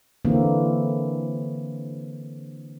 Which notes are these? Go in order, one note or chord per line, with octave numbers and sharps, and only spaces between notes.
D3 E3 A#3 C4